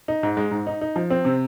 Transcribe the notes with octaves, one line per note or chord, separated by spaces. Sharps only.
D#4
G#2
G#3
G#2
D#4
D#4
F3
C4
C3